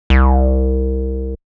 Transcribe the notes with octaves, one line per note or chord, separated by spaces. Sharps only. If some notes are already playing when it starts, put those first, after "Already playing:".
C2